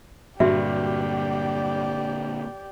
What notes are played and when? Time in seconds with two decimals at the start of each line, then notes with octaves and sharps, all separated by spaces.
0.40 G2 A#2 D3 F#4 G4 D5 E5